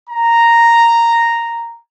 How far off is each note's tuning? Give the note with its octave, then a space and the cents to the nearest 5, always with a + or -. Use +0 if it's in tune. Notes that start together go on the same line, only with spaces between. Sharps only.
A#5 -5